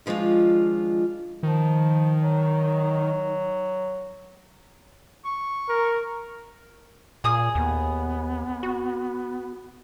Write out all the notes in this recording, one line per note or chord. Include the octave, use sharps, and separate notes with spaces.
D#3 F3 G#3 D4 F4
D#3 F3
F#3
C#6
A#4
A#2 G#4 G#5 D#6
D#2 B3
F#4